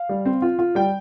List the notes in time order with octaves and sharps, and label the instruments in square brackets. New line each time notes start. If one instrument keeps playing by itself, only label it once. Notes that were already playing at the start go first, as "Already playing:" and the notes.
Already playing: [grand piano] F5
G3
C4
F4
F4
G3 G5